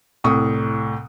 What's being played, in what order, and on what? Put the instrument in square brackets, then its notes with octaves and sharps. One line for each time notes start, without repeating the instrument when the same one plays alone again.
[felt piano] C2 A2 C#6 D#6